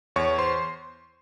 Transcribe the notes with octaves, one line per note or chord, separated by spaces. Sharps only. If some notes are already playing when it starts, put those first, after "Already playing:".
E2 C#5 C#6
C5 C6